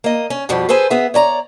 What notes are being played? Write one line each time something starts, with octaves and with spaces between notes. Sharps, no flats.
A#3 D#5
C#4
F2 B2 F3 G3
G#4 A4 B4 C5 G#5
B3 G#4 E5
C#5 D5 A#5